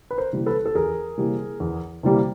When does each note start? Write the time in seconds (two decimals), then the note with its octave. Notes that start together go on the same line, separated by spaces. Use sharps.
0.11 B4
0.18 A#4 C5
0.33 C3 E3 G3 A#3
0.46 A4 B4
0.66 A4
0.75 E2 G#4 A#4
1.17 C3 E3 G3 A#3
1.60 E2
2.03 C3 E3 G3 A#3